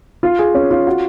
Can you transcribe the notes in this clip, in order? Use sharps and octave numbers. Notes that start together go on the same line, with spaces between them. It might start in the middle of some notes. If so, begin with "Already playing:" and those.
F4
G#4
C#4
F4
F#4